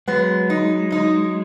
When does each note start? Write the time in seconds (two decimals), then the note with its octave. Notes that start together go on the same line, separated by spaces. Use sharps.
0.08 F#3 G#3 B3
0.50 D#4
0.92 D#4